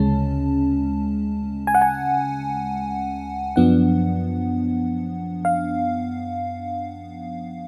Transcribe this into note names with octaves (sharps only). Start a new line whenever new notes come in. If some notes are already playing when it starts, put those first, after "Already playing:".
Already playing: D2 C#3 G#3 C#4 A5
G#5
F#5
G#5
F#2 F3 B3 D4 F#5
F5